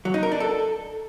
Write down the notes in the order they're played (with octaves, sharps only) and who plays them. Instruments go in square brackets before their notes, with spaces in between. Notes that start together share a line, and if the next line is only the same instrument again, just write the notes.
[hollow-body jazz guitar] F#3
D#4
A#4
D4
A4